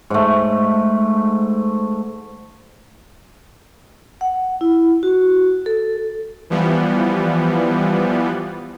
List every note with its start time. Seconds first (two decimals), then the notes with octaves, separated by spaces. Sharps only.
0.10 G#2 A3
4.21 F#5
4.61 E4
5.03 F#4
5.66 A4
6.50 E3 F3 G3 B3